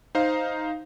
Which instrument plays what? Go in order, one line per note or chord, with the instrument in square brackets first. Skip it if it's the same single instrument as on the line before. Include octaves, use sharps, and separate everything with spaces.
[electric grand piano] D#4 C5 F5